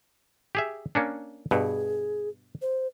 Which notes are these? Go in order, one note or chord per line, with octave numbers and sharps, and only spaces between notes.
G4 G#4 E5
A#3 C#4 D4
G2 B2 G#4
C5